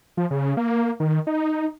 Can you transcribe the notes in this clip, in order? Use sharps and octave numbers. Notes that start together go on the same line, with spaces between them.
F3
C#3
A#3
D#3
D#4